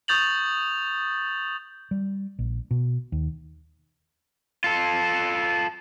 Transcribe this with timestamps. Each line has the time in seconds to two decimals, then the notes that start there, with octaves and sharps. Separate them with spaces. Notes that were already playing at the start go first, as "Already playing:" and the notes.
0.08 C#6 D#6 G6 A6 F7 F#7
1.91 G3
2.39 A#1
2.71 B2
3.12 D#2
4.64 F4 A4